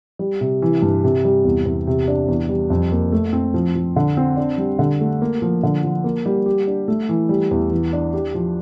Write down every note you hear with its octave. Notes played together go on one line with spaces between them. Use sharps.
G3
C3
E3
G2
C3
G3
E2
E2
C3
D4
E2
G3
F2
A#3
A3
C4
F3
F3
D3
C4
D4
G3
D3
A3
A#3
F3
D3
F3
A#3
G3
G4
D4
A3
E3
G3
E2
E3
D4
G4
F3